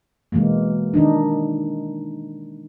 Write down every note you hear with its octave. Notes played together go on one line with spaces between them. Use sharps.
B2 E3 G#3 A#3
D#3 D4 D#4